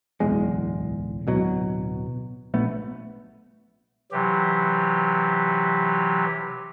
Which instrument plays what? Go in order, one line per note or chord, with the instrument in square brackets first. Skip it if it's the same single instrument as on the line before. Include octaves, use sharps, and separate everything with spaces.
[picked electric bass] D1 B1 E2 G#3
D1 B2 F#3
A#1 A3 B3
[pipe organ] C3 E3 F#3 G4